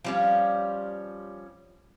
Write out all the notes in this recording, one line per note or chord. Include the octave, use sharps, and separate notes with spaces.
F3 G3 C#4